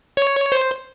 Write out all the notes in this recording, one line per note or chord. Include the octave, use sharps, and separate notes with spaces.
C#5
C5